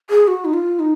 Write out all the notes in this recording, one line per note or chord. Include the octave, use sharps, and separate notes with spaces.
G#4
F#4
D#4
F4
D#4